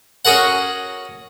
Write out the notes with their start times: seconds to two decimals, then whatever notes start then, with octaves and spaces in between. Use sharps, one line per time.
0.25 C#4 F#4 G#4 A#4 F#5